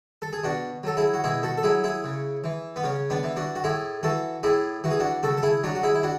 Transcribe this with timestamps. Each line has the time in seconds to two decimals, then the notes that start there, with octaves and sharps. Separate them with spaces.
0.22 A4
0.33 G#4
0.44 B2 D4 F#4
0.83 F#3 A4
0.97 E4 G#4
1.14 F#4
1.24 B2 E4 G#4
1.43 F#4 A4
1.58 A4
1.63 F#3 E4 G#4
1.84 E4 G#4
2.04 C#3
2.44 E3
2.76 B3
2.84 C#3 C#4
3.10 B3 D4
3.24 E3
3.36 D4 F#4
3.55 F#4
3.64 A2 E4 G#4
4.03 E3 F#4 A4
4.43 A2 E4 G#4
4.84 E3 F#4
4.91 G#4
5.00 D4 F#4
5.23 C#3 F#4 A4
5.37 A4
5.43 E4 G#4
5.63 F#3 D4 F#4
5.75 F#4
5.83 E4 G#4
5.95 E4
6.03 D4 F#4